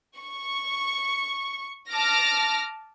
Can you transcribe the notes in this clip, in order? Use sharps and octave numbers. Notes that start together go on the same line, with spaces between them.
C#6
A5 D6 F6 A#6